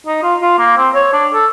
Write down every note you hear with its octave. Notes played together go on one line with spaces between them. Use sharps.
D#4
F4
F4
A#3
C4
C#5
D4
A4